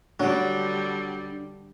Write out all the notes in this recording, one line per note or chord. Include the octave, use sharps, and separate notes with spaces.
D3 F#3 G3 D4